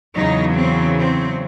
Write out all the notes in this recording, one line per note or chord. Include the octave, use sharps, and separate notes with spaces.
E2 C#3 F#3 D#4
C4
C4